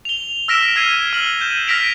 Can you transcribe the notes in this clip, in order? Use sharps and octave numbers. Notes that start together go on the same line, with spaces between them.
F7 G7
E6 F6 A#6 B6 D7 E7
F6 G#6 C7 D#7 E7 G7
F6 F#7
G6 D#7 E7
F6 A#6 B6 D7 F7